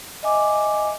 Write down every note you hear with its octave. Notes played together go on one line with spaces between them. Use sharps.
D#5 E5 G#5 D6